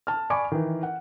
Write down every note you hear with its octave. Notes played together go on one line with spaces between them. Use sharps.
A5 F6
D5 G#5 B5 C#6 D6 D7
D#3 E3
F#5